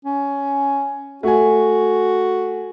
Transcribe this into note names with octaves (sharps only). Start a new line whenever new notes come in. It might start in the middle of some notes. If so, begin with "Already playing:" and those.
C#4
A3 F#4 G#5